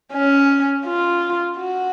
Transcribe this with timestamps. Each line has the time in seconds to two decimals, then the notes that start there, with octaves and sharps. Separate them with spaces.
0.14 C#4
0.86 F4
1.58 F#4